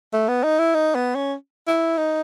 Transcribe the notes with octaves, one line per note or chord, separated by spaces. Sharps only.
A3
B3
D#4
E4
D#4
B3
C#4
E4
D#4